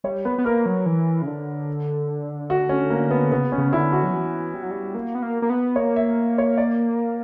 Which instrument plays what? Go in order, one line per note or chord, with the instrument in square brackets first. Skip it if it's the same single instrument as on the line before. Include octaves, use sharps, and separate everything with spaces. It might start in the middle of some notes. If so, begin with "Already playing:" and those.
[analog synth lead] G3 [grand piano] C#5
[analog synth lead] B3 [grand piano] B4
[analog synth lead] B3
[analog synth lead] A#3 [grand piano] A#4
[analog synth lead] F#3
E3
C#3
D3
[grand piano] F#4
C#4
A#3
B3
[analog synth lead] C#3 [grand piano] B3
[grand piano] C#4
[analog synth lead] C#3
[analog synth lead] D3 [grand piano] E4
[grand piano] F#4
[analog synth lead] F#3
E3
G3
F#3
G3
A#3
B3
A#3
A#3
B3
[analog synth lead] A#3 [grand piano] C#5
[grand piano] E5
C#5
D5